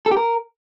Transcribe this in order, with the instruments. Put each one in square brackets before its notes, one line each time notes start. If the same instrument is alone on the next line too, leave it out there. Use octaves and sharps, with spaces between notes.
[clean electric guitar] A4
G4
A#4